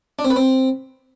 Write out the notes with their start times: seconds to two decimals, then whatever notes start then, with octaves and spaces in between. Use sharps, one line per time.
0.19 D4
0.25 C4
0.30 B4
0.36 C4